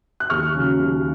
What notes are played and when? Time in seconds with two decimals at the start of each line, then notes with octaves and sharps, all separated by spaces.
0.20 F#6
0.30 D#2 C#6 F6
0.55 C#3 F#3
0.79 D#2